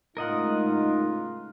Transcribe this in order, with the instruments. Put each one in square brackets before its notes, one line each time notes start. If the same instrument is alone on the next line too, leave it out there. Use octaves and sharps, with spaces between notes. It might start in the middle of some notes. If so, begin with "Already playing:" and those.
[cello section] A2 C#3 G#3 [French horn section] D#4 [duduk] F4 [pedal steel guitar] A#4 D#5 F#5